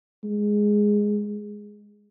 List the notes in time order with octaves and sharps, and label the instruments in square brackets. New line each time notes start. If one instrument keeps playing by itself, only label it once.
[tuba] G#3